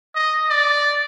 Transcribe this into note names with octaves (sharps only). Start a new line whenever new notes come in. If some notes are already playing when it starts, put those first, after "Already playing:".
D#5
D5